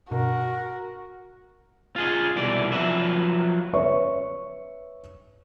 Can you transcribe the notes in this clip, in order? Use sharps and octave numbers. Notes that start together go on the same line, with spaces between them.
G2 B2 F#4 A#4
F4 G#4 D#5
C2 B2 E3 D5
F3 F#3 B4 E5
B4 C#5 E5 C#6